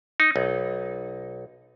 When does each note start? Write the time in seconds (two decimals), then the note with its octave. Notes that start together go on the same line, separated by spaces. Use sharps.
0.20 D#4
0.36 B1